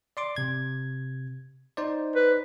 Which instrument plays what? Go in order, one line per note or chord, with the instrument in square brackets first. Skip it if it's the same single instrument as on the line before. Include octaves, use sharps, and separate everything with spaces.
[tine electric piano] D5 C6 D6
C3 G#6
D#4 C5 D5
[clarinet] B4